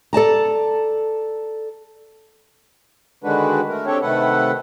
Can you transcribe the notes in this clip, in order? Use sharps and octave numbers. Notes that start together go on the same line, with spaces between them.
A4 D5 A5 A#5
D3 D#3 G#3 D4 F#4 B4
A3 A#4
C4 D4 G4 A4 C#5
C3 D#3 A3 A4 B4 F#5